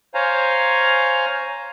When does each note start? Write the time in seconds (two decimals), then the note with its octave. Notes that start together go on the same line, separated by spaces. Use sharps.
0.15 C5 C#5 F5 G#5 A#5